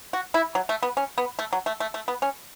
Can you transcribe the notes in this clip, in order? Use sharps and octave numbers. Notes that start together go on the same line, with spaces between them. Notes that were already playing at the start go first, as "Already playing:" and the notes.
F#4
E4
F#3
A3
B3
C#4
B3
A3
F#3
A3
A3
A3
B3
C#4